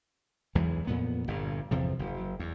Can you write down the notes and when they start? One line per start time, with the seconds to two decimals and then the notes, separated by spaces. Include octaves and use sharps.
0.55 B1 E2 E3 G#3
0.87 F2 A#2 B3
1.28 G1 G2 A#2
1.71 G1 E2 C3 F3
1.99 F#1
2.39 E2